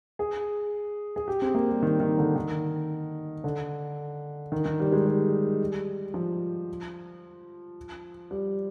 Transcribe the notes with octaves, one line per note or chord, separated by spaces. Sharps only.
G#4
G#4
G4
C4
A#3
G3
D#3
D#3
D3
D#3
D3
D#3
D#3
G3
G#3
G3
F3
G3